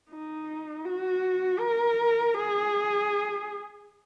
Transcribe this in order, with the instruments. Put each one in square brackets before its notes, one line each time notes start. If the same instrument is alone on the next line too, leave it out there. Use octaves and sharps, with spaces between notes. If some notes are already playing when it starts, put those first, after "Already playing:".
[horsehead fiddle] D#4
F#4
A#4
G#4